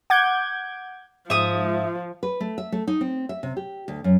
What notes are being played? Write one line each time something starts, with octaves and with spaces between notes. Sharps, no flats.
F#5 D6 G6 G#6
G#2 F3 E5 D#6
B4
A3
E5
A3
D#4
C4
E5
C3
G4
D2
F#2